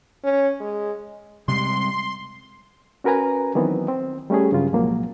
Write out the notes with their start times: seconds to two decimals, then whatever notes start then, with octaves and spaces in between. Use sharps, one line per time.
0.24 C#4
0.60 G#3
1.48 C3 G3 G#3 C6
3.04 C#4 F#4 A#4 B4 G#5 A#5
3.55 D#3 E3 F#3 B3 C4
3.88 C4
4.30 G3 A3 C#4 G4 G#4
4.52 G2 C#3 F#3 F4
4.72 C2 A#2 F3 F#3 G#3 A#3